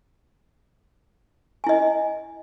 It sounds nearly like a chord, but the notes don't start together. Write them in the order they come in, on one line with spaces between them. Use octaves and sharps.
G#5 E4 D#5